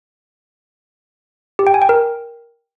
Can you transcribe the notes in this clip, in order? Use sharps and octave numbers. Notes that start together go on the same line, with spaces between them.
G4
G5
G#5
G5
A#4